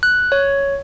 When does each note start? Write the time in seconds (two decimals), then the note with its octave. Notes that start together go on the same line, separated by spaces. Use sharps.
0.03 F#6
0.32 C#5